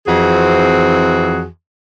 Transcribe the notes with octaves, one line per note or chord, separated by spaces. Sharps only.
F2 E3 C4 F#4 G#4